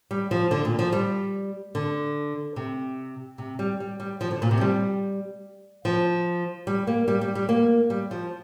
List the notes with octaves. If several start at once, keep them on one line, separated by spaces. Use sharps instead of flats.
G3
F3
D3
A#2
F3
G3
D3
C3
C3
G3
G3
G3
F3
D3
A#2
C3
F3
G3
F3
G3
A#3
G3
G3
G3
A#3
G3
F3